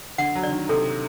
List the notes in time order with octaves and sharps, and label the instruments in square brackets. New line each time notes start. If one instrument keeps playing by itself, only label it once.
[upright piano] D3 [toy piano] F#5
[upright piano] F#3
[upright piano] D3 [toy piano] D5
[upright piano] D#3
[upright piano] C3 [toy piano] A4